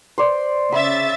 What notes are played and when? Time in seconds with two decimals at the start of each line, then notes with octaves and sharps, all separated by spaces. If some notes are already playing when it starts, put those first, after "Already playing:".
0.18 C5 D5
0.72 C#3 E5 B5 A6